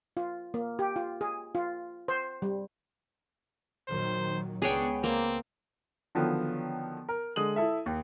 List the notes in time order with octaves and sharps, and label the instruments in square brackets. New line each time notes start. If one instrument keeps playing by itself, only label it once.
[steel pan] F4
A#3
G4
F4
G#4
F4
C5
G3
[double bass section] A#2 D#3 F#3 [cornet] C5
[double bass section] C#2 B3 [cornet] D4 [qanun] G#4 C#5 G5
[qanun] A#3 [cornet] C4
[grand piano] D3 D#3 F3 F#3 B3
A#4
D3 G#3 D#6 F#7
E4 A4 E5
D#2